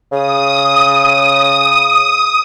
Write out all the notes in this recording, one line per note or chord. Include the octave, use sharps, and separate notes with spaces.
C#3 D#6